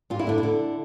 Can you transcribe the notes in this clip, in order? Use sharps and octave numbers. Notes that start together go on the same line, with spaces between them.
G2 F4
E4
D3 D4
E4
D3